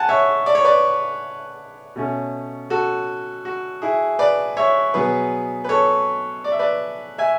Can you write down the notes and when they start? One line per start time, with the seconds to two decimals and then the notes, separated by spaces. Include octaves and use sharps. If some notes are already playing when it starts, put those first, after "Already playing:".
Already playing: F#5 G#5 A5
0.09 C#5 E5
0.46 D5
0.55 C#5
0.64 B4 D5
1.96 B2 A3 C#4
2.70 F#4 A4
3.45 F#4
3.82 E4 G#4
4.19 B4 D5
4.57 C#5 E5
4.94 B2 F#3 B3 G#4 B4
5.64 B4
5.69 A4 C#5
6.44 D5
6.52 E5
6.59 B4 D5
7.18 E5 G#5